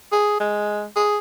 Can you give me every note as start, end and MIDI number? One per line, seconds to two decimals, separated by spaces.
0.12 0.36 68
0.40 0.86 56
0.96 1.19 68